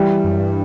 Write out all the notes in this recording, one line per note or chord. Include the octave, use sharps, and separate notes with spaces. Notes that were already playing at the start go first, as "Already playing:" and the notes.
Already playing: E3 G3
F#2
G2